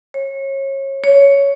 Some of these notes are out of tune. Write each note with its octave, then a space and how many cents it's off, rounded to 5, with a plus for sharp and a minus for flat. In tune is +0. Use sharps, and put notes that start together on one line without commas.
C#5 -30
C#5 +10